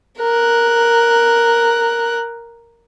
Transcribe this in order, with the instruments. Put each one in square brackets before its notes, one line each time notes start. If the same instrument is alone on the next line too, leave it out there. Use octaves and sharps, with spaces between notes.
[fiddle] A#4 F#6